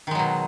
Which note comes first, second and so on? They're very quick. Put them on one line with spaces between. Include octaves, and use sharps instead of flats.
D#3 G#3 F#3 B2